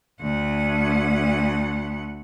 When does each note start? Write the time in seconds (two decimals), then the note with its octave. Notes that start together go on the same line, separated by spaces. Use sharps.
0.21 D2 F#5